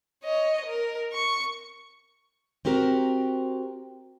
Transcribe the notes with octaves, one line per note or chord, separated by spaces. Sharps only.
C#5 D#5
A#4
C#6
C4 F#4 G4 A#4 C5